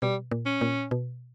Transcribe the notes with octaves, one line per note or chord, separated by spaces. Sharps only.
B2 G3
A#2
C#4
A#2
B2